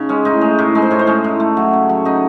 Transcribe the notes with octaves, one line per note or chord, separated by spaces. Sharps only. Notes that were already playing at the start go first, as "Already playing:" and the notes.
Already playing: C#3 D#4
G#3 C#4
A2 D#4
G#3
A2
G#3 D#4
C5
A2 C#5
C5
G#3 C#4
A2
A3
F#3
C#3
F#3
C#3 D#4